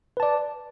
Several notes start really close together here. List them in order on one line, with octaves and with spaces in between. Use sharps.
B4 A5 D5